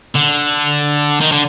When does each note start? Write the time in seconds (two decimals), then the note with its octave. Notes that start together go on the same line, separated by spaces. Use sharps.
0.16 D3
1.20 D#3
1.32 D3